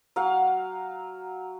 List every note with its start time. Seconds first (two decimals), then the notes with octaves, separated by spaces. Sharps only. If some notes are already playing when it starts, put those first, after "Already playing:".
0.16 F#3 F5 F#5